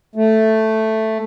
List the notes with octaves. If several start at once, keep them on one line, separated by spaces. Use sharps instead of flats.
A3